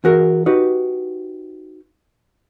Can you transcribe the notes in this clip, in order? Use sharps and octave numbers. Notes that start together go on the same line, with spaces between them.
E3 F#4 G#4 A#4
D#4 F#4 G4 B4